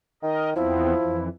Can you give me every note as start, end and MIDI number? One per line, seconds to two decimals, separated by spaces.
0.23 0.53 51
0.23 0.50 70
0.23 0.50 75
0.56 0.94 40
0.56 1.25 53
0.56 0.94 59
0.56 0.94 60
0.56 1.25 64
0.99 1.29 41
0.99 1.29 52